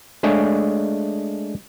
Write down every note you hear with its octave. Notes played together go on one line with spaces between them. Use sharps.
G#3 A3 D4 G#4 C#5 F5